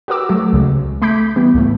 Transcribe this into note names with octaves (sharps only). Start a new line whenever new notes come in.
F#4 G4 A#4 B4 D6 E6
F#3 A3 F#4
C#2 C#3 G#3
A3 B5 D6 G6 B6
E3 G3 B3
C#2 A2 A3